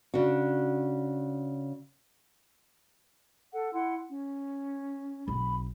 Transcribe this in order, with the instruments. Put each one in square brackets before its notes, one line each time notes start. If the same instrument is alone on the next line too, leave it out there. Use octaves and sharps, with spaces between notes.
[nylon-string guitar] C#3 D4 F#4
[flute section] A4 F#5
E4 F#5 C6
C#4
[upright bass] B1 C4 [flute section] B5